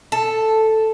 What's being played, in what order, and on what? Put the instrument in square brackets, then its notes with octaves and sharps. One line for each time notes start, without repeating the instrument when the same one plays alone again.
[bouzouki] A4